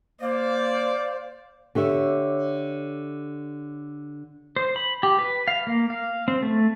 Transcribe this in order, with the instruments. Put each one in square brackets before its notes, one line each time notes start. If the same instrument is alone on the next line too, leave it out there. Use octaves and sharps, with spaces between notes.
[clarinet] A#3 [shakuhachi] C5 [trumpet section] D5 [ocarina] F5
[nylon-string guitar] D3 G4 C#5 E5
[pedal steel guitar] C5
B5
G4
B4
F5
A#3
F5
C4
A3